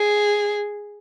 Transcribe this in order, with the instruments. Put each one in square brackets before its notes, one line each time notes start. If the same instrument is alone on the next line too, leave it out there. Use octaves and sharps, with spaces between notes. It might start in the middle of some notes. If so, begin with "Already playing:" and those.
Already playing: [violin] G#4